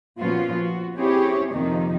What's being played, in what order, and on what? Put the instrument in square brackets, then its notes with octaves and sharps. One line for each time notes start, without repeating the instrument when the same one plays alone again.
[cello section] A#2 F3 B3 C#4 F4 F#4
F#4
C4 C#4 E4 G4 G#4 C#5
F2 C3 D#3 F3 A#3 D#4